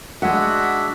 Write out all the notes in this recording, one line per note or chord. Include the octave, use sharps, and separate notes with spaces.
G#3 D4 F#4 E5 F#5